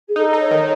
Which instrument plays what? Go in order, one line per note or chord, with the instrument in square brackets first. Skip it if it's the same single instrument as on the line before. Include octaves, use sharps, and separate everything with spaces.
[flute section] G#4
[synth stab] D#4 [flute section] A4
[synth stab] D#4
[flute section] C#5
[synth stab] D#3